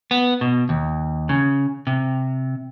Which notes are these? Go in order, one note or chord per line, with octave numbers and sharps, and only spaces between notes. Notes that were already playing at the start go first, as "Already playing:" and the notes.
B3
B2
D#2
C#3
C3